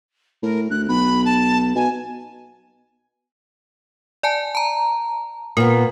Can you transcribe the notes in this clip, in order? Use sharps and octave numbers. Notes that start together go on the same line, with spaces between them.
A2 A#4
D2 F#6
B1 B5
A5
B2 G#5
D5 G#5 A5
A5 A#5
A#2 B3 A#4